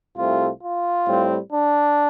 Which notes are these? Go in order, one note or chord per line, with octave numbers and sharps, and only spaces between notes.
C2 C3 A3 C4 F4
F4
A2 G3 C4
D4